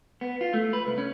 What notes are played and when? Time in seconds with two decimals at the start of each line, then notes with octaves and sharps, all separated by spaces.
0.21 B3
0.41 F4
0.54 A3
0.73 B4
0.87 C2
0.98 C#4